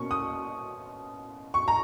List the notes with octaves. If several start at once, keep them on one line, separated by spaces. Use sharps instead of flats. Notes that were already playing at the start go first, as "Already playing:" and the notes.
Already playing: B2 A#3 C#4 C#6
D#6
C#6
A#5